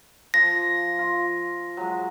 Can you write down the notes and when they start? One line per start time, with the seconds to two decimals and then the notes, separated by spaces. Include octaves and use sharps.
0.34 F3 A#6
0.99 F4
1.77 F#3 G#3